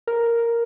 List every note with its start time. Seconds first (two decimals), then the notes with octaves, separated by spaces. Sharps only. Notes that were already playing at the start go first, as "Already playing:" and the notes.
0.07 A#4